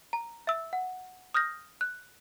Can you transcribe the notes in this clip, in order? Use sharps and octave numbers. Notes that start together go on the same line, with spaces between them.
A#5
E5 E6
F#5
D#6 F6 G6 A#6
F#6